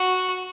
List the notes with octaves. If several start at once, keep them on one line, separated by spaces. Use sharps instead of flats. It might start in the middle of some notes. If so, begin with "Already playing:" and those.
Already playing: F#4